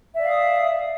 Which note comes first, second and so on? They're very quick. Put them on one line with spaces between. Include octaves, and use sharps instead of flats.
E5 D5 F5 D#6